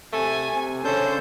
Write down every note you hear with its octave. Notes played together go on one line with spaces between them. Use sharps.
C3 A3 G#5
C3
C#3 C#4 D4 A4 C5 G6